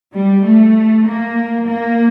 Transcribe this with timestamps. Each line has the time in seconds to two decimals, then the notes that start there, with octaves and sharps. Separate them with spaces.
0.14 G3
0.45 A3
1.06 A#3
1.66 A#3